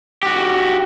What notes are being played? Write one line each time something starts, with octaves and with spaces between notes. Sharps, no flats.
F#4 G4